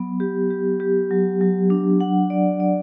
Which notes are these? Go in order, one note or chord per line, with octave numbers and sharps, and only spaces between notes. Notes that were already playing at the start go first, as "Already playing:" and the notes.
Already playing: F#3 B3
G4
G4
G4
F#3
F#3
D4
F#5
D5
D5